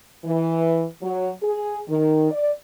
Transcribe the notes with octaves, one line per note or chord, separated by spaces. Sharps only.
E3
F#3
G#4
D#3
D5